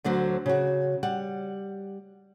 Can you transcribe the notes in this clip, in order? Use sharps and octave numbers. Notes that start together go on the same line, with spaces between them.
D2 D3 F#3 C5
C#3 F#4
G3 F#5